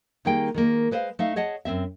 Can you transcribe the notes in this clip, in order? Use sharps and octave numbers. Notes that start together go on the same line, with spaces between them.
D#3 G3 A#3 D#4 G#4 G5
D#3 G#3 A#3
G#3 B4 C5 D#5 F5
A3 D#4 E5 F5
G#4 C#5 D#5 F#5 A5
F#2 F#3 C4 E5